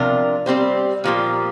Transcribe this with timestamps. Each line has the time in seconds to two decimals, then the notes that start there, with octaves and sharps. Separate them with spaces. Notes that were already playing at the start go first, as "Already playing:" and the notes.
Already playing: C3 F3 D4 F4 A#4
0.46 G3 C4 G4 C5
1.04 A#2 F3 A#3 G4